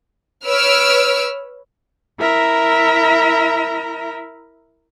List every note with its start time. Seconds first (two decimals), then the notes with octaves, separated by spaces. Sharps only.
0.45 B4 C#5 E6 F6 D7
2.18 E4 A#4 E5 A#5